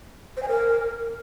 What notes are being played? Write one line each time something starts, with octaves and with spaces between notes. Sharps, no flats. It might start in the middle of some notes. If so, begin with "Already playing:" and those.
C5
G#5
A#4